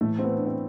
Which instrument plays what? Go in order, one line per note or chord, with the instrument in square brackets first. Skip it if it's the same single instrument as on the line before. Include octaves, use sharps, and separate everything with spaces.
[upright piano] A2 E3 A3
C4
B3
D4
C4